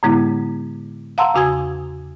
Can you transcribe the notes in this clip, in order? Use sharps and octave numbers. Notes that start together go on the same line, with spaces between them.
A2 D3 G#3 B3 E4
F5 F#5 A5 A#5 C6 E6
E2 C#3 F#4 G#5 D#6 G#6